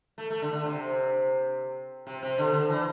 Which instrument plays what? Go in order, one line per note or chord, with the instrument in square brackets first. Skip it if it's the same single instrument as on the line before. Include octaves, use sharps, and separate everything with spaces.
[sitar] A3
A3
D3
D3
C3
C3
C3
D3
D3
E3